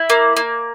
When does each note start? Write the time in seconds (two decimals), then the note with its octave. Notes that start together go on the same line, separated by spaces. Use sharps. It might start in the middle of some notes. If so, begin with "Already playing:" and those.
Already playing: E4
0.10 A#3
0.37 A#3